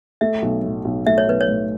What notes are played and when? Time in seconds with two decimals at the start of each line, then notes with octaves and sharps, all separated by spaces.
0.21 A3 E5
0.42 B1
0.63 A2
0.85 B1
1.07 A3 E5
1.18 C#5
1.27 B1 B4
1.41 C#5
1.48 A2